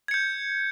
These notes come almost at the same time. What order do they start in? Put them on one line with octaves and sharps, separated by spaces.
G#6 C#7 G6